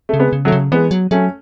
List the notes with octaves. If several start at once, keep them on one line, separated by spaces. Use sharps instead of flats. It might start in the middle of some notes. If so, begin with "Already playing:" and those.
C#3 A3
G#3 B3
C#3
D3 F#3 A3
C#3
E3 G#3 B3
F#3
F#3 A3 C#4